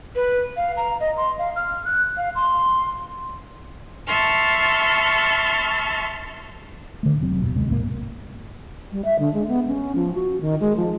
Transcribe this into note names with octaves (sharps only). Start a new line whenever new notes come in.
B4
F5
A#5
D#5
C6
F5
F6
F#6
F5
C6
E5 A5 C6 C#6 F6
D3 A3
F1 F#3 C4
D#1 F2 B2
D2 C3 G#3
B1 G#2 F#3 A#3
G3
E5
D3
G#3
B3
C#4
F3
F#4
D#3
G#3
F3